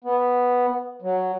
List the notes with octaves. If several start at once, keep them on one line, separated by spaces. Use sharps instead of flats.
B3
F#3